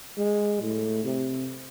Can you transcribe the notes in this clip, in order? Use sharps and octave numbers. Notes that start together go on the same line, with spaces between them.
G#3
A2
C3